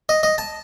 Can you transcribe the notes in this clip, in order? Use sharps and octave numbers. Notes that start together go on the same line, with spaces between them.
D#5
D#5
A5